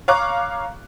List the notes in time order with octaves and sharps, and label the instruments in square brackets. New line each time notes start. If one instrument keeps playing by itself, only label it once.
[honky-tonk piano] C#5 F5 A#5 C#6 D6 F#6